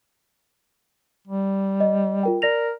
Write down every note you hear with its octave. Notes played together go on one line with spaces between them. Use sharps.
G3
D#5
F4 A#4 G5
A#4 D5 A#6 F7